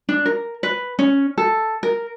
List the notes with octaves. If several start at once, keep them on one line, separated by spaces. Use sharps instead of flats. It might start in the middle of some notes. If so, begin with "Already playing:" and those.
D4
A#4
B4
C#4
A4
A#4